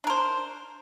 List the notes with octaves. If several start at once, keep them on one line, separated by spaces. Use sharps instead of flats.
D4 A#4 C5